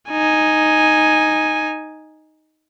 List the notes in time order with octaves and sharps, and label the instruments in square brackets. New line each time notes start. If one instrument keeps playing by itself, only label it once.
[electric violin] D#4 G#5